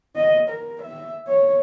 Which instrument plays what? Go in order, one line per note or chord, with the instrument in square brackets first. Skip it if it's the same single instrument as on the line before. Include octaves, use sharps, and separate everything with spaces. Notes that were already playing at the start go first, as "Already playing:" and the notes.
[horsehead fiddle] D#5
A#4
E5
C#5